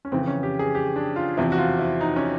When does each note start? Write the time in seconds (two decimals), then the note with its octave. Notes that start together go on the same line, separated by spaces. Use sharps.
0.05 C#4
0.12 F2 C#3 E3 C4
0.27 C#4
0.43 G4
0.59 G#4
0.75 G4
0.96 D4
1.16 F4
1.37 E2 C3 F3 E4
1.52 F#4
1.58 F4
1.79 E4
2.01 D#4
2.16 C#4